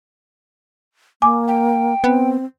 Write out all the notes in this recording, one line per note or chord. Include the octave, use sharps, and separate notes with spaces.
A#3 G#5 D6
G5
B3 C4